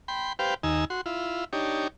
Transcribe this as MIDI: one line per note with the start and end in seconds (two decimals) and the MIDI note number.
0.08 0.33 79
0.08 0.33 83
0.08 0.33 84
0.39 0.54 67
0.39 0.54 71
0.39 0.54 72
0.39 0.54 77
0.39 0.54 79
0.63 0.85 39
0.63 0.85 63
0.63 0.85 80
0.63 0.85 88
0.90 1.01 66
0.90 1.01 84
1.06 1.44 64
1.06 1.44 65
1.53 1.88 62
1.53 1.88 63
1.53 1.88 67
1.53 1.88 73